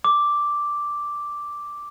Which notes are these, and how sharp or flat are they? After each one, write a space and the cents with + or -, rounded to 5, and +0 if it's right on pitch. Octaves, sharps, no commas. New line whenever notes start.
D6 +0